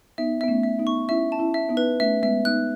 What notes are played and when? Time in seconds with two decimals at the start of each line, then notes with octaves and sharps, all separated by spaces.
0.18 B3 D#4 E5
0.41 B3 E5
0.48 A3 C#4
0.63 E5
0.79 B3 D#4
0.87 C#6
1.09 C#4 E4 E5
1.32 A5
1.39 C#4 E4
1.54 E5
1.69 B3 D#4
1.77 B4
2.00 A3 C#4 E5
2.23 G#3 B3 E5
2.45 B3 D#4 F#6